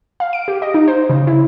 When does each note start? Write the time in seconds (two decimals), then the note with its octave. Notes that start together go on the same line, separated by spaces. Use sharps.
0.20 F5
0.33 D7
0.48 G4
0.62 D#5
0.74 D#4
0.88 C5
1.10 C#3
1.27 E4